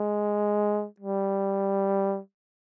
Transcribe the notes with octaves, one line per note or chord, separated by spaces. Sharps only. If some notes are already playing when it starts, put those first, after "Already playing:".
Already playing: G#3
G3